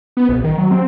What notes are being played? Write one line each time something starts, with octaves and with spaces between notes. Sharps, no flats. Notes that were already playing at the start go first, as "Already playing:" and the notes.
B3
A#1
D#3
F#3
C4